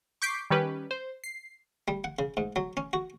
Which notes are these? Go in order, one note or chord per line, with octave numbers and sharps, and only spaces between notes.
C#6 D6 G6 B6 C7 D7
D#3 G3 C#4 G4 B4
C5
C7
G3
F#5
C#3
G#2
F#3
C#4
F#4